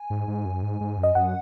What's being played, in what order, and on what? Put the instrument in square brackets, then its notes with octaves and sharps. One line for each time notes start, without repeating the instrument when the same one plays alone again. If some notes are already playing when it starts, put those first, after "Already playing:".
Already playing: [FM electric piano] G#5
[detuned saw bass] G#2
G#2
F#2
G#2
G#2
F#2
[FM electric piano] D#5
[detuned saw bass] F#2 [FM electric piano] F#5